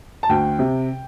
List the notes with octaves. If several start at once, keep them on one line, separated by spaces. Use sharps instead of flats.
A5
D2 G5
C3